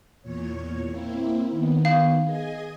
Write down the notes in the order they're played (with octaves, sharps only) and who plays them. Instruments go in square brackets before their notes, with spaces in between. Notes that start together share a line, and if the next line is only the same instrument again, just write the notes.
[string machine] E2 A#2 C#5
A#3 C4 E4
D#3 B3
[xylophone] F5
[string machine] G#4 D#5 G#5